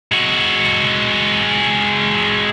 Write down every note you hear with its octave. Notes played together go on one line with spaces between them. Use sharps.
G#3 F#4